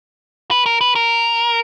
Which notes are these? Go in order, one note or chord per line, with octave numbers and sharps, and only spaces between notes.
B4
A#4
B4
A#4